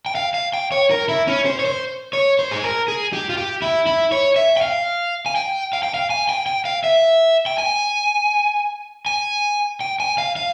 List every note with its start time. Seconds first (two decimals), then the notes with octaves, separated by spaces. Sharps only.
0.06 G5
0.15 F5
0.34 F5
0.53 G5
0.72 C#5
0.91 A#4
1.09 E4
1.27 C#4
1.46 C5
1.59 C#5
1.65 C5
2.13 C#5
2.39 C5
2.51 G#4
2.64 A#4
2.88 G#4
3.13 G4
3.30 F4
3.37 G4
3.62 E4
3.86 E4
4.12 C#5
4.36 E5
4.57 G5
4.61 F5
5.26 G#5
5.36 G5
5.73 F5
5.83 G5
5.94 F5
6.10 G#5
6.29 G5
6.46 G5
6.65 F5
6.84 E5
7.46 G5
7.58 G#5
9.06 G#5
9.81 G5
10.00 G#5
10.18 F5
10.36 F5